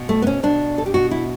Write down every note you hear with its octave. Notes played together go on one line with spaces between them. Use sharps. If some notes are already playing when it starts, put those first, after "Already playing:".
Already playing: B2
A3
B3
C#4
B2 D4
A4
G4
B2 F#4
E4